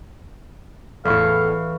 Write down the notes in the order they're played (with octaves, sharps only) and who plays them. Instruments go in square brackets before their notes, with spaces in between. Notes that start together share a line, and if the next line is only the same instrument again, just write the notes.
[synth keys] E2 A2 [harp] E3 C#6 [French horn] A4 [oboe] F5